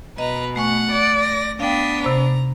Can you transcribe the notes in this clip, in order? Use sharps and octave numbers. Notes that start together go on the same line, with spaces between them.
B2 B4 D#5 A#5
A3 F#5 G#5 C#6
D5
A#6
B3 D4 F5 G5 D#6 B6
C3 C5 A#5 B5